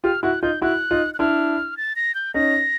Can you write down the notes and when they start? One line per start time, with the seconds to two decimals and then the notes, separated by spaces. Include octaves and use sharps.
0.04 F4 G4 F6
0.23 E4 F#4 F#6
0.42 D#4 F4 G6
0.62 E4 F#4 F#6
0.91 D#4 F4
1.14 F#6
1.19 D4 E4 F6
1.77 A6
1.96 A#6
2.15 G6
2.34 C#4 D#4 A#6